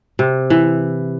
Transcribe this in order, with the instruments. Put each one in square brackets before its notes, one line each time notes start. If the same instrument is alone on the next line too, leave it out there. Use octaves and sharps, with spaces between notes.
[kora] C3
E3